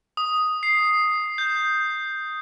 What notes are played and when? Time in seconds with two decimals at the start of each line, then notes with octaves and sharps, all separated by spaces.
0.17 D#6
0.63 C7
1.38 G6